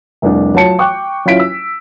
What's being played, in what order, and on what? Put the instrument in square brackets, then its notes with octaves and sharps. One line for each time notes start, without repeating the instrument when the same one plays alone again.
[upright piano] F1 C2 D4
F#3 F4 A5 C#7
G5 C#6 D6 F#6
F#3 C#4 E4 F4 B6 D7
E6